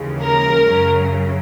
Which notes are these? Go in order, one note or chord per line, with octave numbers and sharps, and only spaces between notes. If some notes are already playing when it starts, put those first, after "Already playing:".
Already playing: D#2 C#3 E3 G#3
A#4
F#2 C#3 F#3